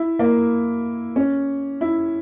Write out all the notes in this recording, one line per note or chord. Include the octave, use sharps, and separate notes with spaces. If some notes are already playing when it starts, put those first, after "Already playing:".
Already playing: E4
A#3
C#4
E4